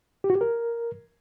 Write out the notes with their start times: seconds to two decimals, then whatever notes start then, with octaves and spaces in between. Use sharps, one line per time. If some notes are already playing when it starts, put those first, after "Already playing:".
0.24 G4
0.30 F#4
0.35 G4
0.41 A#4